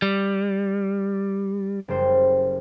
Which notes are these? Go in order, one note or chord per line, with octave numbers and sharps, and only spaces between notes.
G3
F#1 G3 C5